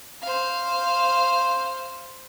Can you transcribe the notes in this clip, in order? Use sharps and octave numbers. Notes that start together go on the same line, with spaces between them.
C5 F5